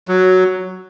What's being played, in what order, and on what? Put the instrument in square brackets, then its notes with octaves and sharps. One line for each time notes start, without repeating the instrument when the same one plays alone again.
[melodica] F#3